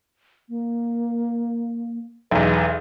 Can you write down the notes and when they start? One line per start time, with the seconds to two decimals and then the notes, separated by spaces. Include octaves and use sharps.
0.49 A#3
2.31 B1 E2 B4